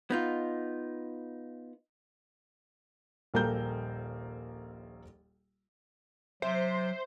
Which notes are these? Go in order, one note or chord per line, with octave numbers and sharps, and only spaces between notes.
B3 D#4 F4
D#1 A#1 A#3 A4 A#5 G6
C3 F#3 C5 E5